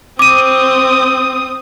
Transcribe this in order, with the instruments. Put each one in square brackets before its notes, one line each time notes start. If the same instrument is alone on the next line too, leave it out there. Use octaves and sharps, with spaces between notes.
[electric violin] C4 D#6 [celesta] D6 D#7